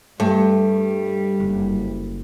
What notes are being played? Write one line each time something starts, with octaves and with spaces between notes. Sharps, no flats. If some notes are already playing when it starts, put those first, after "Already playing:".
G2 G3 A3
F#1